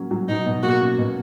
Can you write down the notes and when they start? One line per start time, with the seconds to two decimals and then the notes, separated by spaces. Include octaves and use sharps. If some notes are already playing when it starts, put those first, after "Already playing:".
Already playing: F#3 A#3 C#4
0.11 F#3
0.28 B2 D#4
0.46 B2
0.63 A#3 F#4
0.80 C#4
0.98 B2